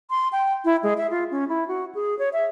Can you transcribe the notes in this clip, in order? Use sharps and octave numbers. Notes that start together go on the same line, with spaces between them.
C6
G5
E4
G#3
E5
F4
C#4
E4
F#4
G#4
C#5
E5